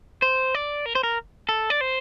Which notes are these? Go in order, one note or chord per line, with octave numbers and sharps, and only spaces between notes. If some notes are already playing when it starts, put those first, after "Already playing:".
C5
D5
A#4
C5
A#4
A4
D5
C5